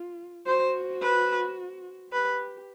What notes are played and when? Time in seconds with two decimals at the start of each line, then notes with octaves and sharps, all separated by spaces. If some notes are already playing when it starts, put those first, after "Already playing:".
Already playing: F4
0.47 F#4 C5
1.02 B4
2.11 G4 B4